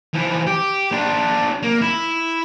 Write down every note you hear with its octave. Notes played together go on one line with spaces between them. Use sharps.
E3 F3
G4
D4 F4
A#3
E4